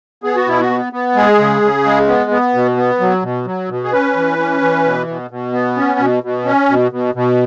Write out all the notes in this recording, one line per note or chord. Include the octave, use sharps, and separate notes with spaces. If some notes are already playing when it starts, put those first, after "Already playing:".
B3 G#4
F#4
B2 E4
F#4
B3
B3
G#3 G#4
C#3
C#3
G#3
B3
B3
B2
B3
F#3
B2
F#3
B2
G#4
C#4 B4
E3
C#4
E3
B2
B2
B2
B3
C#4
B2
B2
C#4
B2
B2
B2